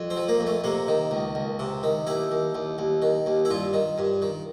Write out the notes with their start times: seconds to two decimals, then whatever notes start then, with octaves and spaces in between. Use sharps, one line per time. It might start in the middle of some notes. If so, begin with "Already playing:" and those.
Already playing: F2
0.10 C4
0.17 F3
0.28 A#3
0.40 F2
0.46 A3
0.64 C3 A#3
0.88 D#3
1.11 C#2
1.35 C#2
1.59 C3
1.83 D#3
2.07 D#2 E4
2.31 D#2
2.55 D#2
2.78 D#2
3.02 D#3
3.26 D#2
3.45 E4
3.50 G2 F4
3.73 D#3
3.98 G2
4.22 D#3